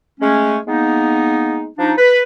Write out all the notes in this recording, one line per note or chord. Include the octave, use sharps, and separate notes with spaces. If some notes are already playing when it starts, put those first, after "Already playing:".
G#3 A3 C#4
G#3 A#3 B3 D#4
F3 D4 D#4
B4